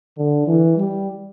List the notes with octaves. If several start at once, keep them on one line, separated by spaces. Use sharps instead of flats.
D3
E3
G3